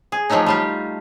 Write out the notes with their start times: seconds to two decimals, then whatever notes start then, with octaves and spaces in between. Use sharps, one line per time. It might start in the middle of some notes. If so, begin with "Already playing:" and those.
0.12 G#4
0.30 F3 F#3 A3 D4 D#4
0.46 G3 F4 G4